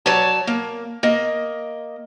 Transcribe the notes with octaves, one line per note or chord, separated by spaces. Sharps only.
F#3 C#5 D5 A5
A#3
A#3 D#5